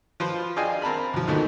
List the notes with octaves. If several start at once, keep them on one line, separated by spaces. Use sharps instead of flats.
F3 F4 B4 C5
D4 G#4 D#5 F5 G5 G#5
C4 A#4 A5 B5
B1 F3
D2 G#2 B2 D#3 A3 B3